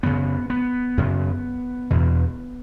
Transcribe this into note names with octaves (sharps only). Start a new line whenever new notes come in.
F#2 C#3 B3
B3
F#2 C#3
E2 B2